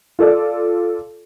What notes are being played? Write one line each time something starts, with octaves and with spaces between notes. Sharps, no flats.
F4 A4 D5